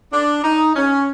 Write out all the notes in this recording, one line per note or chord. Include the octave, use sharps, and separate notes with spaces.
D4
D#4
C#4